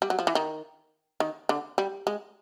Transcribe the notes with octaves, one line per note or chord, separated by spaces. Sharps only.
G3
F#3
F3
E3
D#3
D#3
D3
G3
G#3